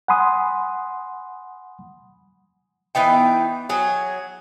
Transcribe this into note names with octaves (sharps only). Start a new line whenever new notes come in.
F#5 G#5 B5 C6 D#6
E3 B3 D#4 G5
F#3 G#4